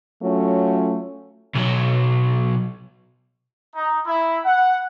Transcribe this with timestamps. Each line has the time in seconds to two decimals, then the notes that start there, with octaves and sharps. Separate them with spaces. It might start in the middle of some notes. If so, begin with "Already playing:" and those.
0.23 F#3 A3 C#4 F4
1.55 B1 F#3
3.76 D#4
4.06 E4
4.45 F#5